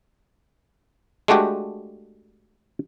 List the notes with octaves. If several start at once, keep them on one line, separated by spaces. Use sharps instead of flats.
G#3 A3 D4 F#4 G4